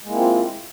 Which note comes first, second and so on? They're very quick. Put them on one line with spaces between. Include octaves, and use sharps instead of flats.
G#3 A#3 E4 C4 F4